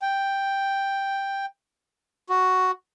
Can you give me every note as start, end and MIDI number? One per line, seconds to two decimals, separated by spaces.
0.02 1.46 79
2.29 2.71 66